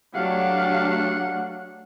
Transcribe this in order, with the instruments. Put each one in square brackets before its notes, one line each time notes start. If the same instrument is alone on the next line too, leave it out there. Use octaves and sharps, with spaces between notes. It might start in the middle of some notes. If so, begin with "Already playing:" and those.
[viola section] F#3 A3 D4 [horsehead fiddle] G4 F5 [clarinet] F#5